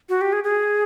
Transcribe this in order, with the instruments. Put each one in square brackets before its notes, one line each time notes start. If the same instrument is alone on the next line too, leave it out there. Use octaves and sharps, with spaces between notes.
[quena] F#4
G4
G#4
G#4